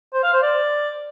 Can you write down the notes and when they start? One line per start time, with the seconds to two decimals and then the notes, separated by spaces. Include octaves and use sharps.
0.14 C5
0.24 F5
0.33 C5
0.43 D5